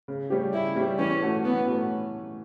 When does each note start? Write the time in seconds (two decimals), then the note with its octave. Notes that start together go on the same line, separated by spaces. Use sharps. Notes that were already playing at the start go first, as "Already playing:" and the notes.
0.08 C#3
0.30 G3 C#4 G4
0.53 C#3 E4
0.76 G3 C#4 G4
0.98 E3 C#4
1.21 A3 C#4 F#4
1.45 E3 B3
1.67 A3 C#4 F#4